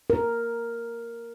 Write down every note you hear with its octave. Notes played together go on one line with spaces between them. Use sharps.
A#4